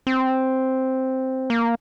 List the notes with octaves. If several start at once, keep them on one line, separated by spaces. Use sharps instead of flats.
C4
A#3